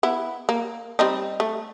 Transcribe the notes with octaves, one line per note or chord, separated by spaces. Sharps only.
B3 E4
A#3
G3 C4 D#4
A3